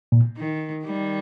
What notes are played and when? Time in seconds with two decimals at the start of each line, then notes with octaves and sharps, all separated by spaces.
0.12 A#2
0.37 D#3
0.86 D#3 G3